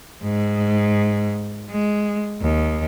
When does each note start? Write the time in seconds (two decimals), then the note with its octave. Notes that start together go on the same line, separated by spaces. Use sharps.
0.23 G#2
1.70 G#3
2.41 D#2